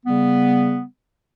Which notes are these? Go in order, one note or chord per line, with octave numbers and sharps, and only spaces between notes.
C#3 G3 B3